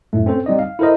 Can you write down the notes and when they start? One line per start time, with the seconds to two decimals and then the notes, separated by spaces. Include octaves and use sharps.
0.13 F#2 A2 A3
0.26 C4 C#4 A4 C5
0.46 G3 C4 D#4 D5 D#5
0.59 F5
0.79 E4 A4 A#4 C5 D#5